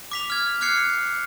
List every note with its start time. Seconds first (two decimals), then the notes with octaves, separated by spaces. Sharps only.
0.11 D6 B6 F7
0.30 F6 G#6
0.61 D6 F6 F#6 G#6 C7 C#7